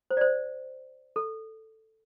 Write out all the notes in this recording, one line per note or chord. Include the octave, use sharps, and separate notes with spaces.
C5
D5
C5
A4